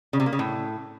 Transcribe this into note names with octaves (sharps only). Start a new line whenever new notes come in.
C#3
C3
A#3
C#3
A2